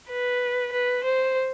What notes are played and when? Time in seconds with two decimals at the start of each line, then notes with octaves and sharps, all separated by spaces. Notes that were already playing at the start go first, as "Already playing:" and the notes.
0.09 B4
0.73 B4
1.04 C5